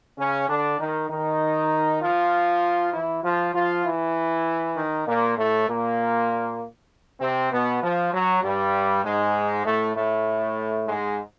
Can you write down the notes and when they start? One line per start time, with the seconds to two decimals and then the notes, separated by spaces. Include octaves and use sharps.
0.18 C#3 C#4
0.49 D3 D4
0.79 D#3 D#4
1.10 D#3 D#4
2.02 F3 F4
2.94 E3 E4
3.23 F3 F4
3.54 F3 F4
3.85 E3 E4
4.76 D#3 D#4
5.07 A#2 A#3
5.38 A2 A3
5.68 A#2 A#3
7.21 C3 C4
7.52 B2 B3
7.83 F3
8.13 F#3
8.43 G2 G3
9.04 G#2 G#3
9.66 A2 A3
9.96 A2 A3
10.87 G#2 G#3